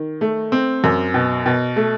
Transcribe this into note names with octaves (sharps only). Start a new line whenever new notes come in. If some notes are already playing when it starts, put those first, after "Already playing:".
Already playing: D#3
A3
C4
F#2
B2
B2
A3